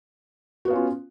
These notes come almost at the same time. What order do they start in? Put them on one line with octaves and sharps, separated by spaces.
F#4 B3 F5 C#4 F4